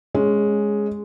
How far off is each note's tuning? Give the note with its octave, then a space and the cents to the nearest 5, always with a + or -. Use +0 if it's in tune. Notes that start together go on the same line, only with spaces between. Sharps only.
G#3 +0 C#4 +0